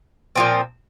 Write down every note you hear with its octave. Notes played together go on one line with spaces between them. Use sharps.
A#2 F3 C4